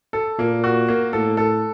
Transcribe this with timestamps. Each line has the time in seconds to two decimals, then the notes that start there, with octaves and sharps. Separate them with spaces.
0.13 A4
0.38 A#2 A#3
0.64 F#4
0.88 A#3
1.13 A2 A4
1.37 A4